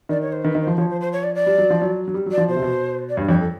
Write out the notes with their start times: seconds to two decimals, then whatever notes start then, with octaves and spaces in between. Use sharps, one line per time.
0.09 D#3 D5
0.22 C#5
0.32 C5
0.44 D#3 B4
0.55 D#3
0.61 C5
0.67 F3
0.78 F3 C#5
0.90 C5
1.01 C5
1.12 C#5
1.23 D5
1.35 D5
1.46 G3
1.58 F#3
1.70 F3
1.82 F#3
2.08 F#3
2.14 G3
2.26 F#3
2.32 D5
2.38 F3
2.48 B2 C5
2.56 C3
2.62 B2
3.09 D5
3.16 G2 C#5
3.28 F2 C#5
3.39 A4